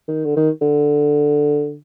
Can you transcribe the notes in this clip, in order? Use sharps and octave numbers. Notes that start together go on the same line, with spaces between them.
D#3
D3
D#3
D3